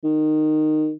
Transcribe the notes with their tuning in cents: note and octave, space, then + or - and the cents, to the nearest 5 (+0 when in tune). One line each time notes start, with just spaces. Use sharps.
D#3 -15